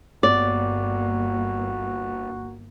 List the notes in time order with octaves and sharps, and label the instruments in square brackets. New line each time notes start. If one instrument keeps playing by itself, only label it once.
[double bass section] G1 A#3 [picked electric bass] G2 B3 [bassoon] F#4 [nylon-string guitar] D5